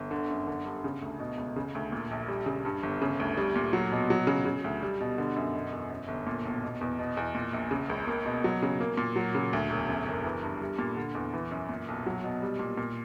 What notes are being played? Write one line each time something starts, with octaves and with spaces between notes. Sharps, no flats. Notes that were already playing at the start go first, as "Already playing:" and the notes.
Already playing: G1
D3
F#2
D3
G2
C#3
D2
B2
C#2
C#3
D2
A#2
A#1
G3
C#3
G2
G1
C#3
D2
G3
A#2
F#3
B2
F#3
C#3
C#3
D2
G3
B2
D3
F#2
B2
E2
F#2
G1
A#2
B1
B2
E2
B2
E2
A#2
A#1
C#3
C#2
A#3
B2
F#3
C#3
A#3
A#2
F#3
C#3
D2
E1
F#2
F#1
E3
G2
G3
A#2
D3
E2
E3
F#2
A#2
B1
F#3
B2
G3
A#2
A#2